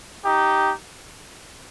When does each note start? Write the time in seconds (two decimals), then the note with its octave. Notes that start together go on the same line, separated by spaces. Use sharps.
0.24 D#4 G4